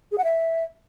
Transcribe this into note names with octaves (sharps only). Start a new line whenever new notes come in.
G#4
F#5
E5